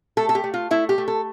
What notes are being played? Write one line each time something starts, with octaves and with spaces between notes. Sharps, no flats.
A3 A4
A4
G4
A3
F4
A3 E4
G4
A3
A4